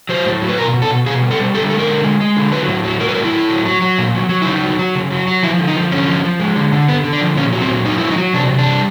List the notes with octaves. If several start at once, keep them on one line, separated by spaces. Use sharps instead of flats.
F#3 C5
A2
F#3
B4
B2 A#4
B2
A4
B2
B2 G#4
G3
A4
G3
D3 A4
G#3 A4
A#4
D3
G#3
G#3
D3
F#3 B4
A2
F#3
F#3 A#4
B4
A2 A#4
E4
A2
F#3
F#3
F#3
A#2
F#3
F#3
E4
C#3 D#4
F#3
F#3
C#3
F#3
F#3
F3 E4
D3
D#4
F3
D3 C#4
F3
F3
G#3
D3
D3
D3 B3
D3
D4
F3
A#2 C#4
F#3
C4
A#2
F#3 D#4
F#3 E4
D#4
F#3
C3 D4
C3
D4
G3